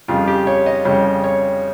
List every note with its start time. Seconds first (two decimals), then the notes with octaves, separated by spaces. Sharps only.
0.08 F2 C#3 G3 F4
0.27 G4
0.47 C#5
0.66 D#5
0.85 F2 C#3 G3 C#5
1.24 C#5